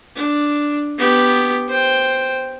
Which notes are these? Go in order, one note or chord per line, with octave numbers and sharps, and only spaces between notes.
D4
B3 G4
C5 G5